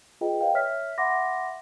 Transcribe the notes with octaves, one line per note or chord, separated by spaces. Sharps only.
F4 G#4 B4 D#5 G5
B4 C5 D#5 F5 G5
C#5 E5 F6 B6
E5 F#5 B5 C6 D6 A#6